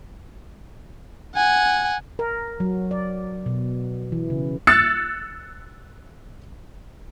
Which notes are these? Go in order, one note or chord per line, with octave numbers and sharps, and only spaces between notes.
F#5 G#5
A#4
F#3
D5
B2
E3
C#3
E6 F#6 A6 C#7